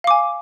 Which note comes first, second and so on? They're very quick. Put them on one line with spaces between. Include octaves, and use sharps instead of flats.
F5 D6 G#5